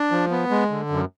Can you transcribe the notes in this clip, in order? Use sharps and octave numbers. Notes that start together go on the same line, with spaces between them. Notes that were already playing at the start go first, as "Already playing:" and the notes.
Already playing: D4
F3
B3
G#3
D3
F#2